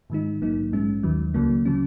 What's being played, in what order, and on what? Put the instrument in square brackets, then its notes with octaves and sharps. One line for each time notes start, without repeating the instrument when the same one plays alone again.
[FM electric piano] G#2 D#3 G#3 D#4
A#1 G#2 F#3 A#3 D#4
A#1 G#2 G#3 C#4
D#2 D#3 F#3
C#2 C#3 F#3 A#3
C#3 F#3 C#4